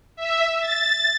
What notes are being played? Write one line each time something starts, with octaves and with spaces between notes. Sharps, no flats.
E5
A6